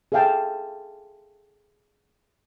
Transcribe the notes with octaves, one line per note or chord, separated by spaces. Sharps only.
G#4 A4 E5 F5 G5 A5